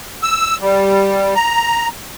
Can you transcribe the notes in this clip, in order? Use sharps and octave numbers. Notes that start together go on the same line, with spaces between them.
E6
G3
A#5